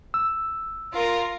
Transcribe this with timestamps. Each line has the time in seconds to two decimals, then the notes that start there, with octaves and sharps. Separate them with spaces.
0.14 E6
0.93 F4 A#4